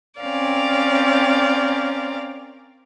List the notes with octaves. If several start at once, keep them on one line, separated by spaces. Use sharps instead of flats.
C4 C#4 A#4 D5 F5